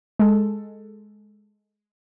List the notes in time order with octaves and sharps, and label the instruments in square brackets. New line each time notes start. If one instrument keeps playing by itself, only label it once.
[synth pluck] G#3 A4